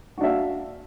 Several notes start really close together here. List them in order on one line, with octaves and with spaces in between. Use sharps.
F#4 D4 E5 F5